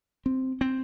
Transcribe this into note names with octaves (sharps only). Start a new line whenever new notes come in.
C4
C4